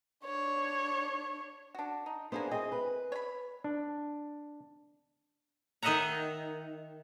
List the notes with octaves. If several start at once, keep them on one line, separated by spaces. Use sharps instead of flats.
D4 C#5
D4 F#4
D#4
A#3 B3 D4 E4 G#4 C5
C4 G#4 D#5
B4
C#5 B5
D4
D#3 D#4 D#5 E5 F#5 A#5